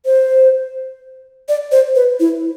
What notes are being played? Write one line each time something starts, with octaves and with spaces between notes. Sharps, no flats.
C5
D5
C5
B4
E4